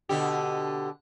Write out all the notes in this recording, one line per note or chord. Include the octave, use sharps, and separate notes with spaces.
B2 D3 G4